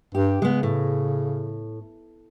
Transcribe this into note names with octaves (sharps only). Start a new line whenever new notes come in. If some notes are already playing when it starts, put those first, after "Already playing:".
G2 G4
C#3 G#3 B3
A2